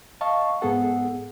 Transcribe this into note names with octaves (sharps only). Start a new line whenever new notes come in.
D#5 F5 A5 C#6
G#2 B3 G#4 A4 F#5